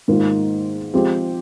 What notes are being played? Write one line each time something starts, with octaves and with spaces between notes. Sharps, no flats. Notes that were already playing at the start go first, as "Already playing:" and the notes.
G#2 D#3 A#3 F4
F3 G#3 C4 G4 C5